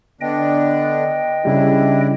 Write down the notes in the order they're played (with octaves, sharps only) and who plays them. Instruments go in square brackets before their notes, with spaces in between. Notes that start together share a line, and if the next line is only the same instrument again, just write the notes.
[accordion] D3 B3 D4 [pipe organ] D#5 G5
[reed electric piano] C#3 G3 [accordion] D4 E4